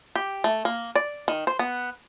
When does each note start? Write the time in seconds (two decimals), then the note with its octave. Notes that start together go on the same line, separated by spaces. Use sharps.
0.15 G4
0.44 A3
0.65 A#3
0.95 D5
1.28 D#3
1.47 C5
1.59 B3